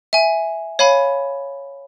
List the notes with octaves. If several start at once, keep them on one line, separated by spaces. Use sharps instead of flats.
E5 G#5
C#5 F5 G#5 B5